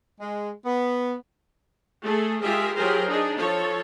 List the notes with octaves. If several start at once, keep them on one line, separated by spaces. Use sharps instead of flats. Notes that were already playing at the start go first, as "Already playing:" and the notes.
G#3
B3
A3 G#4 A4
G#3 F4 G4 G#4 A#4 E5
F#3 F4 G4 G#4 A#4 C5
D4 D#4 G#4
F3 A4 C#5